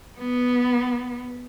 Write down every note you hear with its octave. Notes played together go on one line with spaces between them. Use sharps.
B3